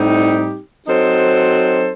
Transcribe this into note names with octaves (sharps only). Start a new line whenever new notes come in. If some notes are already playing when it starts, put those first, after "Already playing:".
Already playing: A2 G3 C4 D#4 G4
F#3 C4 D#4 A4 C5